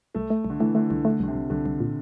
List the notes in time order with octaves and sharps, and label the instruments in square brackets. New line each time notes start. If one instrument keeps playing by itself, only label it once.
[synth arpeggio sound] C2 [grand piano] A3
[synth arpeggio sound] A3
C2
[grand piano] D3
[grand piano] E3 [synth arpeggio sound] A3
[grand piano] D3 [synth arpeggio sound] A3
[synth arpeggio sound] C2 [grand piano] D3
[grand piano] D3 [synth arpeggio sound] A3
[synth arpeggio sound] C2 [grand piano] D3
[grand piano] C3
[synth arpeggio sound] C2
[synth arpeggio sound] C2 [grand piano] D3
[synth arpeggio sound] C2
A#2